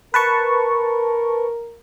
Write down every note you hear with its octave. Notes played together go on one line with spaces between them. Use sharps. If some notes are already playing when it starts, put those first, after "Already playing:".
A#4 B4 A5 C#6